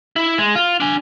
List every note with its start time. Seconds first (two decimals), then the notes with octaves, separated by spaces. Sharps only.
0.16 E4
0.38 G#3
0.55 F4
0.80 D4 G#5